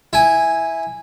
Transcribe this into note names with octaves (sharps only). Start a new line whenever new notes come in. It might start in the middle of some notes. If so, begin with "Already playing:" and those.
E4 G#5